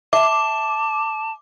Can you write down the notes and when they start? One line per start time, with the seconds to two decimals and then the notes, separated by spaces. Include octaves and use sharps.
0.13 E5 A5 D6